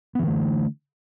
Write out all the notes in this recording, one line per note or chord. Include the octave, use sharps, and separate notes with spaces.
D3 E3 A3 B3